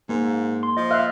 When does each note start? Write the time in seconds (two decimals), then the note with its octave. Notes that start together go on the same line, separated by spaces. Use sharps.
0.09 G#2 A#3
0.63 C6
0.77 F3 D#5
0.91 E5 F5 F6 F#6